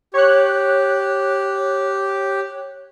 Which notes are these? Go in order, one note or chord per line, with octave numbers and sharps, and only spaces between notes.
G4 C#5 F#6